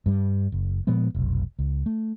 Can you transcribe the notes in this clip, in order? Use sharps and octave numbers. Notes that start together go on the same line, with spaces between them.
G2 G3
F#1
A#2 F3 G#3 B3
F1 B1
C#2
A3